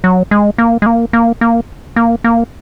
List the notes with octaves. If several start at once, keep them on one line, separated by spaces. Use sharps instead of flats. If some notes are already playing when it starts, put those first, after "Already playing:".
F#3
G#3
A#3
G#3
A#3
A#3
A#3
A#3
A#3